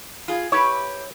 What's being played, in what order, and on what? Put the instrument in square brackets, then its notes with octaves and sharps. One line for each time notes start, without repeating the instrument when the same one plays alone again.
[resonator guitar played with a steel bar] F4 G#4
[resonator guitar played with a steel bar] E4 G4 B4 [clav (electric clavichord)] C#5